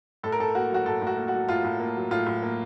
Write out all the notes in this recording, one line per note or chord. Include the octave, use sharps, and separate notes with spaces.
A2 A4
A#4
A2 A4
A#3 F#4
F#3 F#4
A2 A4
A2
F#4
A#3
F#4
F#3
A2 F4
A2
A#3
F#3
A2 F4
A2
A#3